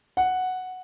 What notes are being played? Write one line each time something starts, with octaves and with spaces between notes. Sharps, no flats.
F#5